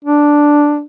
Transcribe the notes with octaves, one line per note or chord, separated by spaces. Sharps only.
D4